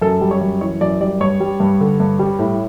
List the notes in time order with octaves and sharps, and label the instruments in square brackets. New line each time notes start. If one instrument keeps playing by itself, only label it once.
[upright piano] F#2 A4
G3
C#5
F#2
E3 C#5
F#2 D5
G3 D5
G2 C#5
G3
G2
D3
G2
G3
A2